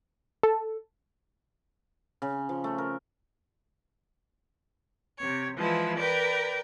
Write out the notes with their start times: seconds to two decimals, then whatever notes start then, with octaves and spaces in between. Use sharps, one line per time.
0.43 A4
2.22 C#3
2.49 F3
2.64 A3
2.78 A#4
5.19 C3 C#5
5.56 E3 F3 G#3 E4 B4
5.97 A#4 B4 D5 G5